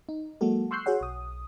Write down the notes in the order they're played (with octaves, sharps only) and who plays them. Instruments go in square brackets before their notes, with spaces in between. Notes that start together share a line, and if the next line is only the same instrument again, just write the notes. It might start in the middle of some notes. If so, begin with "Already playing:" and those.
[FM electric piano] D#4
F#3 G#3 A#3 F#4 A4
C6 C#6 E6 F#6 G6 C7
F#4 G#4 C#5 F#5
B1 D#6